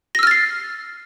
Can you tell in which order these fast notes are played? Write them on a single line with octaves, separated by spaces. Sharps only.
A#6 E6 F6 A6 C7